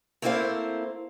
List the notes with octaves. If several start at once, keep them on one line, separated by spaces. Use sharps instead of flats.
A3 A#3 C4 E4 C5 F5